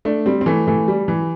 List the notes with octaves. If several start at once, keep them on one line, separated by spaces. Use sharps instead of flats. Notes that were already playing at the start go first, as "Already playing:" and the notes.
A3 D4
G3 C4
C4
E3 A3
E3 A3
G3
E3